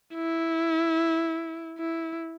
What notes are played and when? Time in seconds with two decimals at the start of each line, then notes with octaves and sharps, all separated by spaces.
0.15 E4
1.79 E4